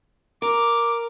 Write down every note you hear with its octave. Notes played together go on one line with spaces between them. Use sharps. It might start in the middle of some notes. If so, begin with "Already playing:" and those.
A#4 D6